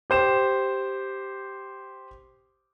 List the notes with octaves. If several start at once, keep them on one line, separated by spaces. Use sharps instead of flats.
G4 C5 E7